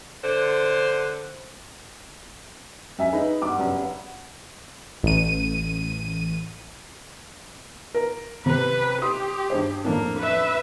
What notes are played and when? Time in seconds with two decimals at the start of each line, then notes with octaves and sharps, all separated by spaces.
0.24 D3 C5
2.98 F#2 E5 G#5
3.13 D#4 G#4 B4 B5
3.42 G2 B3 D6
3.57 F1 F#2
5.03 A1 D#7
7.95 A#4
8.46 C3 B4
9.02 G4 C6 D#6
9.50 G2 G#4 C5
9.85 F2 A2 A#3 D4
10.19 B4 E5